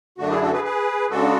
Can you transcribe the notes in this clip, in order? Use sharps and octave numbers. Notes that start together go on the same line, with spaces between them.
F#2 D3 A3 D4 F#4
E4 G#4
F#4 A4
G#4 B4
G#4 B4
C#3 G#3 D4 F#4 A4